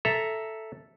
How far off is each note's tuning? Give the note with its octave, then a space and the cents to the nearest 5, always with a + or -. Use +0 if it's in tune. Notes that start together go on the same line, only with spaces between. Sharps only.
A4 +0 E5 +0 A#5 +5